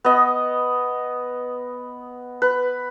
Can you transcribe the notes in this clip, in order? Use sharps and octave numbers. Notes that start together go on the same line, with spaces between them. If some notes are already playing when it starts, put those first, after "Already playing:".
B3 D#5
B4